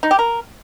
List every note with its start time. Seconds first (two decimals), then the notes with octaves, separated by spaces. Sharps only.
0.03 D#4
0.11 G4
0.19 A#4